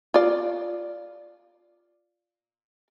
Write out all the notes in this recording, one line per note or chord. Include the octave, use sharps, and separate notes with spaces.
F4 D5